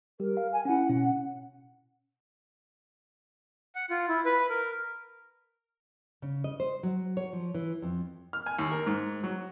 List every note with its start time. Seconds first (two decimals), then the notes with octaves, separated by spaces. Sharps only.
0.20 G3 G4 A#4
0.37 F5
0.52 G#5
0.65 C#4 E4 F#5
0.89 B2 C#4
3.75 F#5
3.90 F4
4.09 E4
4.25 B4
4.49 A#4
6.22 C#3
6.44 D#5
6.60 C5
6.83 F#3
7.17 C#5
7.33 F3
7.55 E3
7.82 F2
8.33 F6
8.46 G#5
8.59 D#2
8.71 A#4
8.86 G#2
9.23 F#3